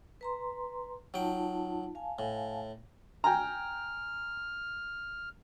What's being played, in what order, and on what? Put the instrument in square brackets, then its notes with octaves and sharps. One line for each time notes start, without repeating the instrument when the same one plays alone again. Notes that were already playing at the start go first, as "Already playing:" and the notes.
[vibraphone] B4 A#5 C6
[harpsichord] F#3 G5 [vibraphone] D#4 F4 A5
[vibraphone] F5 G#5 A5
[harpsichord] A2
[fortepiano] G5 G#5 A#5 [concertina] F6